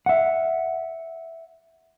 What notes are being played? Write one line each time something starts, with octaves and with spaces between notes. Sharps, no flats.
E5 F#5